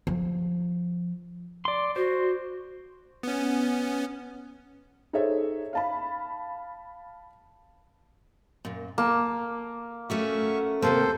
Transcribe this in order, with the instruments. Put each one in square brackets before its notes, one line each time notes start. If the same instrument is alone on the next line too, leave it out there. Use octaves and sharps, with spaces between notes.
[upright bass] F3
[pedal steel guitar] D5 C6
[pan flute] F#4 [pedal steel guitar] C5
[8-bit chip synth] B3 C#4
[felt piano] D#4 G#4 A4 C5 C#5 E5
F5 A5 B5
[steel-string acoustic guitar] F#2 A#2
[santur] A#3 [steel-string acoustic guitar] A5
[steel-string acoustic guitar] A3 C#4 F#4 [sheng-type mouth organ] E5 C#6
[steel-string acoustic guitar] D#2 C3 A#3 [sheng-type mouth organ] A4 C5